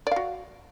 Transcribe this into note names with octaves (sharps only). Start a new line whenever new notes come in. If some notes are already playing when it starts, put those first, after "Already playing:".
F#4 D5 F5